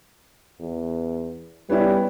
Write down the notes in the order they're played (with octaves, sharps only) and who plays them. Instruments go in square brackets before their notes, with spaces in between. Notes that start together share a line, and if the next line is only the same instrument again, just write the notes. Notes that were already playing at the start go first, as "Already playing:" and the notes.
[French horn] E2
[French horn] G3 [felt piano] B3 C#4 E4